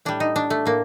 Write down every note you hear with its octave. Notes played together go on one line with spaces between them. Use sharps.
A2 G3 D4
D#4
D4
A3
A2 A#3